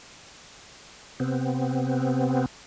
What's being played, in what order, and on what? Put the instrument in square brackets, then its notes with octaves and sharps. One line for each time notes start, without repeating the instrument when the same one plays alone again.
[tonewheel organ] C3 B3 C4